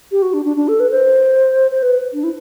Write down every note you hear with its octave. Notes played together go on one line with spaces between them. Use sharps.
G4
F#4
D4
D4
D4
A4
B4
C5
C5
B4
D4
E4